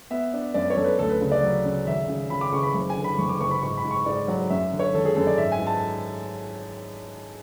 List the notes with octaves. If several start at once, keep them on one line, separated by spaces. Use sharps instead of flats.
B3 E5
D4
F#2 D5
C#5
F#2 A4
B4
D2 A4
B4
C#3
D5
F#3
C#3
G#1 E5
C#3
C#3 B5
D6
C#3 C#6
B5
F#1
G#5
D3
B5
F#1 C#6
D6
F#1 C#6
B5
G#2 C#6
B5
G#2
C#6
G#2 D5
F#3
F#2 E5
D3
C#5
G#1 A4
G#4
F#2 A4
D5
G#2 E5
G#5
G#2
A5